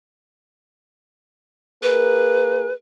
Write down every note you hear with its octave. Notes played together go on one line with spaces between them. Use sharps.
A#3 G#4 A#4 B4